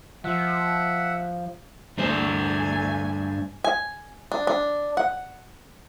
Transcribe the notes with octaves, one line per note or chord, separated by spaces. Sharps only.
F3 E5 F#5
D2 G2 D4 C5 G#5
G#5
D4
D4
F#5